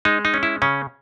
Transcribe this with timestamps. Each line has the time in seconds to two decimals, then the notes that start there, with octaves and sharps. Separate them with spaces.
0.05 G#3 D#4
0.25 D#4
0.34 C#4
0.43 E4
0.62 C#3 C#4